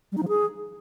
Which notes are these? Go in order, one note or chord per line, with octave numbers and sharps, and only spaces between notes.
G3
D#4
F3
G#4